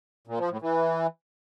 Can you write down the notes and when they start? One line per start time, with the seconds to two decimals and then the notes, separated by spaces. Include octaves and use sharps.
0.27 A#2
0.39 F3
0.50 A2
0.62 E3